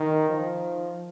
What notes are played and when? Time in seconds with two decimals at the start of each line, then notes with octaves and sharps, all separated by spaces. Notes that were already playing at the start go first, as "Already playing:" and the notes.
Already playing: D#3
0.30 F3